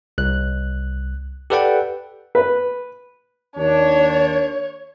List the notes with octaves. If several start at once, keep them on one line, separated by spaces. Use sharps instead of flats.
C2 F#6
G4 A4 B4 D5 F#5 G5
B4
D#2 D4 C#5